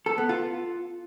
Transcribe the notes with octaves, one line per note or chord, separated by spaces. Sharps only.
A4
B3
F4